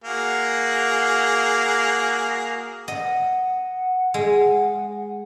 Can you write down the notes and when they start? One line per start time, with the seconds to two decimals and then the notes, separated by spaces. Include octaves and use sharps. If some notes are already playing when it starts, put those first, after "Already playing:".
0.04 A#3 F#4 G#4
2.88 D#5 F#5
4.14 G#3